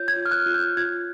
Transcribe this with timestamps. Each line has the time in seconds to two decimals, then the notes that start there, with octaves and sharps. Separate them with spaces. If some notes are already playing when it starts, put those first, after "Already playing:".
Already playing: F4 C#5 G6
0.08 G#6
0.16 F4
0.26 F6
0.31 F#6
0.46 F4
0.54 G6
0.77 F4 G#6